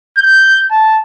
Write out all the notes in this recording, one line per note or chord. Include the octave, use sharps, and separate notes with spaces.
G6
A5